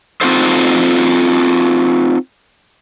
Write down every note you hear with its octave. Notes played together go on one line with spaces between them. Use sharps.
C4 D#4 F4 F#4 A4 C5